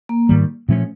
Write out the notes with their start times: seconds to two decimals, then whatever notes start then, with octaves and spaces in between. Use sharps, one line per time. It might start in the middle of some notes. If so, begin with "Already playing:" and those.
0.09 A#3
0.29 G#2 D#3 G3
0.68 A#2 F3 A3 C#4